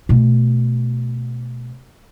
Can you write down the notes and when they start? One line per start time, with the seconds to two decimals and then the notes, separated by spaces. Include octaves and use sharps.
0.09 B2 A3